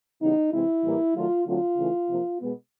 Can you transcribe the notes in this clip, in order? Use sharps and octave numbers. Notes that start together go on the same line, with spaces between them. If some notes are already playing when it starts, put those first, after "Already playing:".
C#3 E3 G3 B3 D#4
C3 E3 G#3 C4 E4
A2 E3 G3 A#3
D#3 F#3 A3 F4
D3 F#3 A3 C4 F4
C#3 E3 A3
C3 F3 A#3
B2 G#3 B3